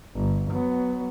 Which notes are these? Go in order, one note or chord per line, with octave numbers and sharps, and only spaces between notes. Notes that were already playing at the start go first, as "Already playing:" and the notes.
G1
F#3 B3